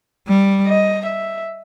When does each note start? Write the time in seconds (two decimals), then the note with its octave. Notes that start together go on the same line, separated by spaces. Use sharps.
0.27 G3
0.67 D#5
1.06 E5